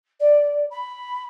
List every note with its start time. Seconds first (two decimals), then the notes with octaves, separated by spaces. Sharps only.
0.20 D5
0.71 B5